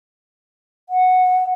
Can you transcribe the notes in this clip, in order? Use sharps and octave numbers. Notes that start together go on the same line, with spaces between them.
F#5